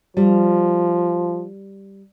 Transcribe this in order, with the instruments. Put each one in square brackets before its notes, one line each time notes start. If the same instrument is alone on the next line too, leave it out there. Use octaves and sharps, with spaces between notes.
[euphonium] F3 [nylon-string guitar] G3